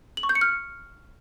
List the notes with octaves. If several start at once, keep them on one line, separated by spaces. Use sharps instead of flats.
F#7
C#6
G6
C#7
F6